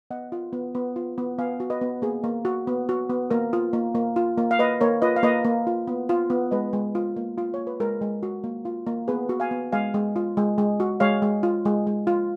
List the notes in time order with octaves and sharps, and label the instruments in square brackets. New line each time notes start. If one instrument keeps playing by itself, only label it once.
[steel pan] B3 D#5 F#5
F4
B3
B3
F4
B3
B3 F5 G#5
F#4
B4 D#5
B3
A#3 G#4
A#3
F#4
B3
F#4
B3
A#3 A#4
F4
A#3
A#3
F4
A#3
F5
A#3 B4 D#5
A#3 A#4 C#5
F4 B4 D#5
F5
A#3 B4 D#5
A#3
F4
B3
F4
B3
G#3 B4 D#5
G#3
F4
A#3
F4
A#3 C#5
B4
G#3 A#4
G#3
F#4
A#3
F4
A#3
B3 G#4 B4
F#4
F5 G#5
B3
G#3 F5 G#5
G#3
F4
G#3
G#3
F#4
G#3 C#5 F5
G#3
F4
G#3
G#3
F4